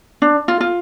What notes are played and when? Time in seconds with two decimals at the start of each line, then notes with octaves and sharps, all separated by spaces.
0.22 D4
0.48 F4
0.61 F4